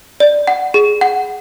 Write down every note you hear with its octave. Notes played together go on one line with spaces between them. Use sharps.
D5
F#5
G#4
F#5